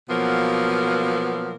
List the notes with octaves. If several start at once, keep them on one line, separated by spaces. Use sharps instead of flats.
B2 F3 F#3 A#3 B3